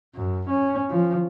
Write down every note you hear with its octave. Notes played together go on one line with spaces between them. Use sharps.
F#2
C#4
F3